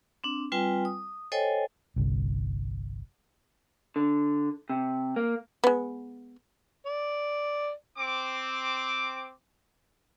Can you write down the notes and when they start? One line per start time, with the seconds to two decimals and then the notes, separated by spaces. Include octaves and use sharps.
0.24 C4 D4
0.52 G3 C4 F4 B4 G5 G#5
0.85 D#6
1.32 A4 C5 C#5 D#5 G5 G#5
1.96 G1 C2
3.96 D3
4.70 C3
5.16 A#3
5.64 G#3 B3
6.86 D5
7.98 C4 D6